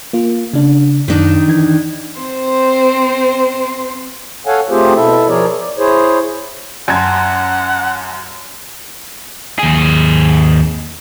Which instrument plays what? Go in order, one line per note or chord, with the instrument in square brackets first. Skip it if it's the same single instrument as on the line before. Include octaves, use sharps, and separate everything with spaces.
[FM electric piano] A#3 F4
C#3 D4
[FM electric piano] F#2 [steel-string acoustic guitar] D#3 D4 D#4
[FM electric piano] E3 G#6
[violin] C4 C5
[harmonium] A4 C#5 F5 F#5 G#5
A3 C4 F4 G4 G#4 C5
B2 E4 A4 E5
F3 G#4 A#4 C#5 D5
D5
E4 G#4 C5 C#5
[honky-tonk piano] F#2 G#6 [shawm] F#5 [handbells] G#5 A5 C6
[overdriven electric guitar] D#2 G#4